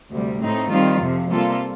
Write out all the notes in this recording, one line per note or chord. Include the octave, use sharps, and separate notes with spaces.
D2 C3 G3
A2 A3 C4 D#4
D#3 G3 C4 F4
F2 C3 F3
C3 G3 A#3 F4 A4